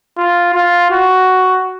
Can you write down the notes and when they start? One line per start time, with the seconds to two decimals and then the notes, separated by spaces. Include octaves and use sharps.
0.17 F4
0.54 F4
0.91 F#4